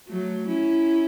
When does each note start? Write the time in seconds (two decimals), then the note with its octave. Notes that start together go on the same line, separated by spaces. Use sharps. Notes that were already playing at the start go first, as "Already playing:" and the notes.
0.09 F#3 A3
0.48 C#4 E4